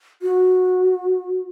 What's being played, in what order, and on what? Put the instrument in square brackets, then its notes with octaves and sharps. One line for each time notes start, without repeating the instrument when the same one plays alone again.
[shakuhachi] F#4